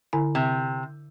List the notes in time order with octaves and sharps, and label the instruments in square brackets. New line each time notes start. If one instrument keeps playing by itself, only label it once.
[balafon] D3 E4 G#5
[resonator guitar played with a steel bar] C3